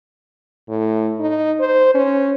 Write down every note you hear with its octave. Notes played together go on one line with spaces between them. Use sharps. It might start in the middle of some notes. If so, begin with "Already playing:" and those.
A2
D#4
C5
C#4